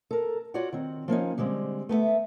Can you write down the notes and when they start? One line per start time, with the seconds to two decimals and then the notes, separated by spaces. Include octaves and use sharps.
0.11 A4 A#4
0.54 F4 F#4 C#5 D5 F#5
0.73 D#3 C4
1.08 F3 A#3 C#4 D#4
1.38 D3 G3 G#3 C4
1.89 A3 B3 A4 E5